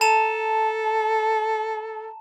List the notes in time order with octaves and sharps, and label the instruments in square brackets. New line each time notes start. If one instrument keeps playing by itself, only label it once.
[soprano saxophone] A4 [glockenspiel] A5 A#5 E7